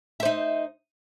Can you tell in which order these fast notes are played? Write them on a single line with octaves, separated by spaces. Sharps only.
E5 C5 D#4